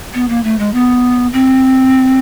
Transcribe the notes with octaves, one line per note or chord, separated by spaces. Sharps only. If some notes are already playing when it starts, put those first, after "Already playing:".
B3
A#3
A3
G#3
B3
C4